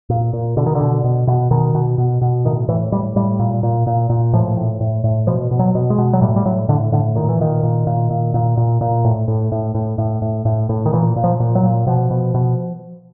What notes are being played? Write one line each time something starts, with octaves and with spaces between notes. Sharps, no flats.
A#2
A#2
B2 D3
D#3
D3
B2
B2
B2
B2 D#3
B2
B2
B2
A2 D#3
A2 E3
A2 G3
A2 G3
A#2
A#2
A#2
A#2
A2 F3
A2
A2
A2
B2 F3
B2
F#3
B2
G#3
B2
F#3
A2 G3
G3
A2 F#3
A2 D3
A2 D3
A#2 D#3
E3
A#2 D#3
A#2
A#2
A#2
A#2
A#2
A#2
A2
A2
A2
A2
A2
A2
A2
A2
D#3
A#2 E3
A#2
F3
A#2
F#3
A#2
B2 F3
B2
B2